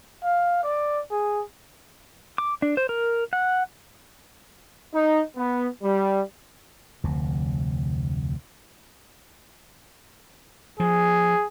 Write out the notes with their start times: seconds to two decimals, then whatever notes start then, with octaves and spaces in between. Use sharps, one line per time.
0.23 F5
0.63 D5
1.11 G#4
2.38 D6
2.62 D4
2.77 C5
2.89 A#4
3.33 F#5
4.93 D#4
5.37 B3
5.83 G3
7.04 F1 D2 C3
10.80 F3 G#4